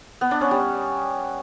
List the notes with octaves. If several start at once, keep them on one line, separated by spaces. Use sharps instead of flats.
B3
D4
C#4
G3